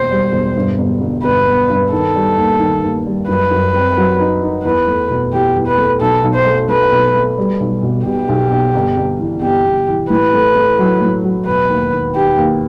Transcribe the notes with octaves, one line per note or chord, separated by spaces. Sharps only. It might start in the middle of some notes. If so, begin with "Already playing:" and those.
Already playing: E1 D#2 C5
G3
E1
G2
G1
G1
G1 B4
B3
G2
D#3 A4
G3
D#2
D#3
D#2
G3
F#2 B4
F#2
C4
F#3
D#4
D#4
E2 B4
A3
B2
E2 G4
E2
B4
A3
B1 A4
B1
C5
A3
A3 B4
B1
A3
G3
B1
B2
B2 G4
B1
B1
G1
G1
E3
G1 G4
G1
E3
A2 B4
A3
A3
F#3
A2
F#3
E1 B4
D#2
D#3
D#3 G4
D#2